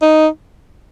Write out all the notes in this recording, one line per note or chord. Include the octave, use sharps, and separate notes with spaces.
D#4